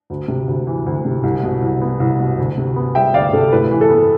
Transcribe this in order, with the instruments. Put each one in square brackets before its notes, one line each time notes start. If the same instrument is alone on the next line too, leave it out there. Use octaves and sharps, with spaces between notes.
[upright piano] D2
C3
D2
E3
D2
C3
C2
B2
C2
B3
C2
B2
D2
C3
B3
G3 E5 G5
D2 D5 F5
C3 A4
A2 B4
E3
A4
B3